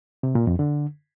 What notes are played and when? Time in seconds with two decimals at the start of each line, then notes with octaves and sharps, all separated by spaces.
0.23 C3
0.35 A#2
0.47 F2
0.59 D3